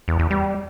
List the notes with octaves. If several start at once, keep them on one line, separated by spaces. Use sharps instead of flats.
E2
E2
G3